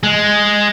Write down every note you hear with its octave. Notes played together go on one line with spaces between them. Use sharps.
G#3